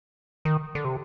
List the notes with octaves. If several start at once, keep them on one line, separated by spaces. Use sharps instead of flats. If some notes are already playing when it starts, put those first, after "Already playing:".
D#3
D3
C3